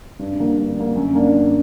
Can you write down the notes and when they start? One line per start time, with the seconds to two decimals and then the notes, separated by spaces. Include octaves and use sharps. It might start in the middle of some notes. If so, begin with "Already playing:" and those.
0.19 G2
0.39 D3 A#3
0.58 G2
0.76 D3 A#3
0.95 F#2
1.14 D3 A#3 D4
1.33 F#2